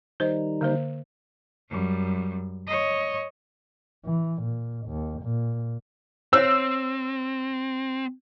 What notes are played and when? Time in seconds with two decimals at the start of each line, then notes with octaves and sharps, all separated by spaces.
0.20 D#3 G3 D#4 C5 D#5
0.61 D3 A#3 C5
1.70 F#2 G3
2.67 C#5 D#5
4.05 E3
4.42 A#2
4.86 D#2
5.22 A#2
6.33 C4 C5 C#5 F5 E6